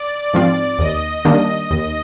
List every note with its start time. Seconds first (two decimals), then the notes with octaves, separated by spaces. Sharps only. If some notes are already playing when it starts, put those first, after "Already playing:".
Already playing: D5
0.33 G#2 F3 C4 F4
0.79 D#2 D#5
1.25 D#3 G3 A#3 D4
1.71 D#2